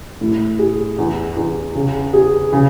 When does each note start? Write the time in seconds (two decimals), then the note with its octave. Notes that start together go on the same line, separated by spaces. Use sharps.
0.21 A2
0.59 G#4
0.98 E2
1.37 E2
1.75 C#3
2.13 G#4
2.53 C#3